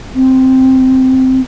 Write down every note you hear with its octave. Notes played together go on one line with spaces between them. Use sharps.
C4